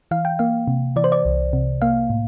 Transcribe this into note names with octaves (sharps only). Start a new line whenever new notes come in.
E3 F5
G5
A#3 F5
C3
E3 D5
C5
D5
C2
C3
A#3 F5
A2